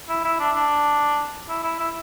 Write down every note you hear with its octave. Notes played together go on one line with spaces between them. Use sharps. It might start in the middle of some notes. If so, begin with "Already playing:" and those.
E4
E4
D4
D4
E4
E4
E4